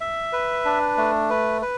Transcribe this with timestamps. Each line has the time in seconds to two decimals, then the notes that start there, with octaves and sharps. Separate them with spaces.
0.01 E5
0.33 B4
0.65 D4
0.98 A3
1.30 B4
1.62 B4